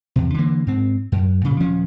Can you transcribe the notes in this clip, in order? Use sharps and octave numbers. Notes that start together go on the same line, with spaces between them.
E2 C3
D3 E3 A#3
G#2 C4
F#2
A#2 C#3
D#1 F3 C#4